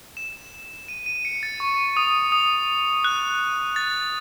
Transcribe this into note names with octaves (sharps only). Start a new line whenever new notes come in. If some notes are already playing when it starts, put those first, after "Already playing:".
E7
D#7
D#7
C#7
A6
C#6
D#6
D#6
F#6
A6